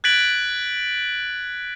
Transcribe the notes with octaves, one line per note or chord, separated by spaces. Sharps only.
F#6 G#6 A6 B6 D7 F#7